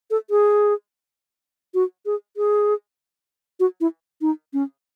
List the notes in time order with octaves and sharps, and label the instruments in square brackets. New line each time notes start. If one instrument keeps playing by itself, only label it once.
[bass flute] A4
G#4
F#4
G#4
G#4
F#4
E4
D#4
C#4